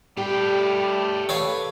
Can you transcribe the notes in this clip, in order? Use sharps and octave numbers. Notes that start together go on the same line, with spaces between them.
G3 A3 G4 G5
A4 B4 C#5 F5